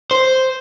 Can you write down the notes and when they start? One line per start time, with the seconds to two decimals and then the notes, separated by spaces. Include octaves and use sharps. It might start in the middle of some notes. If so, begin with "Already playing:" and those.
0.11 C5